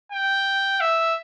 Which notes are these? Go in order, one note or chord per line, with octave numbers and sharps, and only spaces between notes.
G5
E5